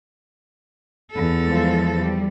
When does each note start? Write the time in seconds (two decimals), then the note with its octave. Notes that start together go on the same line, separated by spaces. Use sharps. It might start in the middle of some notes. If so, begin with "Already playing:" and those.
1.11 E2 A4
1.43 F3 G#3
1.99 G3